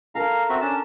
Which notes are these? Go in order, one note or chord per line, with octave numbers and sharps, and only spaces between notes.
A4 A#4 F5 A#5
C4 F#4 E5
C#4 D4 A5